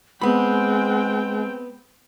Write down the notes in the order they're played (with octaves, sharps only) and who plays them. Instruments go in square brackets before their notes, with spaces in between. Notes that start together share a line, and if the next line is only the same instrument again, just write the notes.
[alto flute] G#3 [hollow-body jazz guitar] B3 B5 [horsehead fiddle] C4 G5